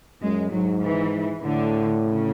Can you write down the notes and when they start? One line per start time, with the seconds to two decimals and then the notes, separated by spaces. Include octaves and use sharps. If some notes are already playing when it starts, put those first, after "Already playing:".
0.21 F#2 G#3
0.52 G#2 F#3
0.82 E3
1.42 A2 D3
2.03 C#3